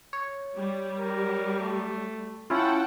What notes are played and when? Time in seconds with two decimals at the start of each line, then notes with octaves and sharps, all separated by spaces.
0.13 C#5
0.55 G3
0.99 A#4
1.59 A3
2.50 C#4 E4 F4 F#5 G5 A5